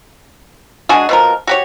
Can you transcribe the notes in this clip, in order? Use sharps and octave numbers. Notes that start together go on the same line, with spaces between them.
G#3 D4 F#4 G#4
B2 F3 A#4
F#4 G4 C#5